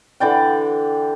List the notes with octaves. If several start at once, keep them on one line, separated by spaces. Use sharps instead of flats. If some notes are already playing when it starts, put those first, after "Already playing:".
D3 E3 D5 G5